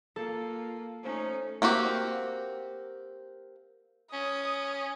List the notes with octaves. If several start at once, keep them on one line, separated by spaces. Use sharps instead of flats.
A#3 F4 A4
A3 C#4 D#4 C5
A#3 C4 F#4 G4
C#4 D#6